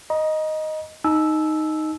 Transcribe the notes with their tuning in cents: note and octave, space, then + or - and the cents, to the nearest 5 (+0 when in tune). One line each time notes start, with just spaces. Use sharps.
D#5 +0 A#5 +35
D#4 +0 A5 -45 E6 +0